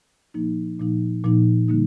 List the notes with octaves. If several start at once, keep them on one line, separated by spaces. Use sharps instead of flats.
A#2 F3 A#3 D#4
A#2 F3 A#3 D#4
A#2 F3 A#3 D#4
D3 G3 A#3 D#4